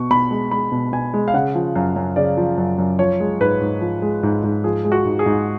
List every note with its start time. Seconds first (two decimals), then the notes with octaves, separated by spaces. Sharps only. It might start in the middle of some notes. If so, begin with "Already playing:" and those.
Already playing: B2 C#6
0.10 B2 B5
0.31 G#3
0.51 G#3 B5
0.72 B2
0.93 B2 G#5
1.14 G#3
1.28 F5
1.34 C#3 F#5
1.55 F3
1.75 F#2 F5
1.96 F#2
2.16 C#3 D5
2.37 F3
2.58 F#2
2.78 F#2
2.99 F3 C#5
3.20 G#3
3.40 G#2 B4
3.61 G#2
3.81 F3
4.02 G#3
4.23 G#2
4.43 G#2
4.64 F3 G#4
4.85 G#3
4.92 F#4
5.05 G#2
5.19 G#4
5.26 G#2